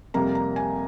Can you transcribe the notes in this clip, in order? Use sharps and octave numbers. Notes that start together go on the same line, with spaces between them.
F2 C3 G3 A#3 A#5
A#5
G#5